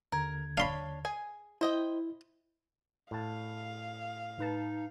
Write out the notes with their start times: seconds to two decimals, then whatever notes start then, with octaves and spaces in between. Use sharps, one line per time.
0.12 D#2 D3 A#4 G#6
0.58 D4 C#5 F5 B5 C6
1.05 G#4 G#5
1.61 E4 C5 D#5 G5
3.11 A2 F5 A5
4.39 A2 D#4 B4 A5